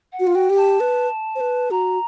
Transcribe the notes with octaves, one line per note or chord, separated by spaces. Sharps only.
F#5
F#4
F4
F#4 G5
G4
A5
B4
C5
B4
F#4 A#5